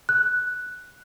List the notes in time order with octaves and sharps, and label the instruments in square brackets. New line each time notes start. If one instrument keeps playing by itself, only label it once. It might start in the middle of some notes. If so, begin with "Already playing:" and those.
[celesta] F#6